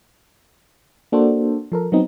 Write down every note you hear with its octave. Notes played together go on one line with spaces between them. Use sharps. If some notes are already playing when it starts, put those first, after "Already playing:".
A#3 D4 F#4 A4 C5
F3 A4 A#4
F#3 B3 C4 D#4